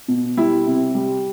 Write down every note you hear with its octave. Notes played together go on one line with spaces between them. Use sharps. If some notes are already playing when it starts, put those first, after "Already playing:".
B2
G3 E4
C3
G3